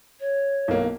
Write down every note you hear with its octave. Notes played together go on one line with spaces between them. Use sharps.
C#5
B1 A#3